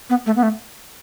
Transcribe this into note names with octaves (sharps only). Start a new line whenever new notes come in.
B3
A3
B3
A3